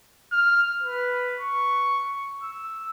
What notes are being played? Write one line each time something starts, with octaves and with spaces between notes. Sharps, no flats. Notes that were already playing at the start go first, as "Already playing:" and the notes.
F6
B4
C#6
E6